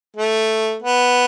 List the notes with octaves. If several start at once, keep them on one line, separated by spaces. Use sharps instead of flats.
A3
B3